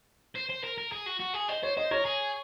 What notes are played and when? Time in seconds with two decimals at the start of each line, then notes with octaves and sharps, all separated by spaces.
0.35 C5
0.49 C5
0.63 A#4
0.78 A#4
0.92 G#4
1.06 F#4
1.20 F#4
1.34 G#4
1.49 C5 D#5
1.63 C5 C#5
1.77 C5 D#5
1.91 A#4 C#5
2.05 G#4